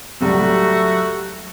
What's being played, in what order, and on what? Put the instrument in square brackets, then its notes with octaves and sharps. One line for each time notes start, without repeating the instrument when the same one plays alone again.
[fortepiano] C#2 A2 G3 [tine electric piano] F#3 G4 A#5 [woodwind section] A3 F#4